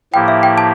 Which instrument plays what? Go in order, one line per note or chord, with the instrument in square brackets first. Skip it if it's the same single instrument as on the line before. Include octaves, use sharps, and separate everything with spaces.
[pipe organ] A2 F3 A#3 E4 G4 [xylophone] G5
[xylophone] E5
G5
A5